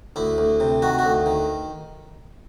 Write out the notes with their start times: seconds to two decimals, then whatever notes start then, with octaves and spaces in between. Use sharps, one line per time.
0.16 D2 E4
0.38 D2
0.60 C3
0.82 D#3 F#4
0.99 D2 F#4
1.26 D#3